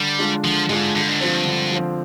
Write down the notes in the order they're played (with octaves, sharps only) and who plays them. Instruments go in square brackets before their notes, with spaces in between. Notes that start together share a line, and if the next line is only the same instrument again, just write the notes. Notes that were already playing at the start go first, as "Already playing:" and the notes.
Already playing: [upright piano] D3 [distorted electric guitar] G3
[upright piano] G#3 D4 F4
[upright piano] D3 [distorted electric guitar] F3
[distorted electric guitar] G#2 [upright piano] G#3 D4 F4
[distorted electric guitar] G2 [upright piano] D3
[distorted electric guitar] G#2
[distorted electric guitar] G2 [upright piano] F3 C4
[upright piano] D3
F3 C4